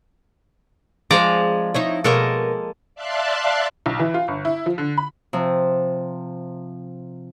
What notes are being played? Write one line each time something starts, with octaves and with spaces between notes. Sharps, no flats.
F3 G#3 C4 D5 A#5
D#4 E4 C#5
B2 G#3 A#3 A4 A#4 C#5
D5 E5 F5 A5 C6 F#6
B1
E3
F4
G1
E4
F3
D3
B5
C3 F3